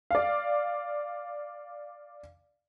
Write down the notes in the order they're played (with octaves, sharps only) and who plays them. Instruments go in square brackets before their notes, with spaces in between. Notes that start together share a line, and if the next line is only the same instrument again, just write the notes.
[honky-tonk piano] D5 F5